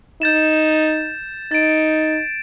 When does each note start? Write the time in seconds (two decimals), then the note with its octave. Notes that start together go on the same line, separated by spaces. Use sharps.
0.22 D#4 G6 A6 E7
1.51 D#4 A6 D7